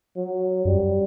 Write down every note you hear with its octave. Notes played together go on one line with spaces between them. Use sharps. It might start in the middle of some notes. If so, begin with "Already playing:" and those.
F#3
F#2 G3